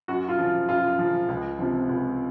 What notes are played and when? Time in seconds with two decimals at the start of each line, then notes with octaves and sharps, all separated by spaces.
0.08 F#2 F#4
0.29 F4
0.38 C#3 F3
0.69 F#2 F4
0.99 C#3 F3
1.28 C#2
1.59 C3 F3
1.89 C#2